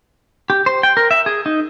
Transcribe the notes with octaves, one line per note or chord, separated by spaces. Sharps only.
G4
C5
G5
A#4
E5
G#4
D#4